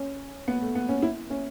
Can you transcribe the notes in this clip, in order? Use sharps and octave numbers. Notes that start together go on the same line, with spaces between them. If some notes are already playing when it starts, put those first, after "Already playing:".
Already playing: C#4
B3
A3
B3
C#4
E4
C#4